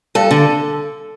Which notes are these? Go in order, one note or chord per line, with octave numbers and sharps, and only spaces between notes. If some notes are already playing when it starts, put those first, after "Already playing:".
G2 A4
D3